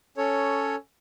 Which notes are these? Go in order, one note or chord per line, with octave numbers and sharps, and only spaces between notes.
C#4 A4 C#5